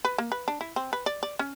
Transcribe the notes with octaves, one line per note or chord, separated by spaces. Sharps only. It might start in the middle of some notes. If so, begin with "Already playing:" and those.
B4
A#3
B4
D4
E4
C4
B4
D5
D5
C#4